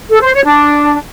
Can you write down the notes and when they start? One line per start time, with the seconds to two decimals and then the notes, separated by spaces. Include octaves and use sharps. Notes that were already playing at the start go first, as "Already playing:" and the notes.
0.10 A4
0.22 C5
0.33 C#5
0.45 D4